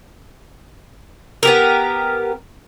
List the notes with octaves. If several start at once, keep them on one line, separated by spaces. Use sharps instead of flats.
B3 G4 A#4